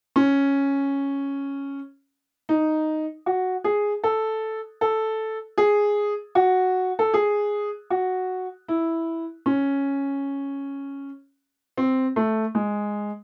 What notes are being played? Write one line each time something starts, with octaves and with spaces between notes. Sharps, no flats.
C#4
D#4
F#4
G#4
A4
A4
G#4
F#4
A4
G#4
F#4
E4
C#4
C4
A3
G#3